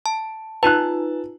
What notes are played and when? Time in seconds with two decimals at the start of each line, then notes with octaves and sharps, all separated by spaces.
0.06 A5
0.63 D#4 F4 B4 A5 F#6